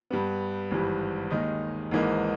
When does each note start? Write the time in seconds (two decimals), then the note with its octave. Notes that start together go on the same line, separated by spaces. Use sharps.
0.10 G2 G3 B3
0.71 G#1 G2 E3 G3
1.30 D#2 D#3 G#3 D#4
1.91 G#1 G#2 E3 A#3 D#4